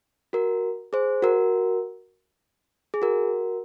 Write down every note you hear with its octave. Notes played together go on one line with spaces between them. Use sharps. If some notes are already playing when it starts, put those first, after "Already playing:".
F#4 A#4
G#4 C5
F#4 A#4
G#4
F#4 A#4